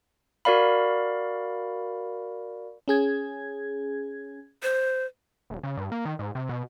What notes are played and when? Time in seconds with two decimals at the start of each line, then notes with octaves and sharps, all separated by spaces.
0.45 F#4 A#4 D5 F5 B5
2.88 C#4 G#4 G#6
4.63 C5
5.50 D#1
5.63 C#3
5.77 G2
5.92 A#3
6.05 D#3
6.19 G#2
6.35 C3
6.49 B2